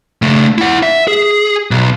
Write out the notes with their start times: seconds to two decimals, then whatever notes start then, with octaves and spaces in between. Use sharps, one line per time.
0.22 C#3 A3
0.58 E4 F#5
0.83 E5
1.08 G#4
1.71 B1